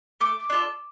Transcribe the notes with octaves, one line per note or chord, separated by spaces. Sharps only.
A3 D6
D4 F4 A4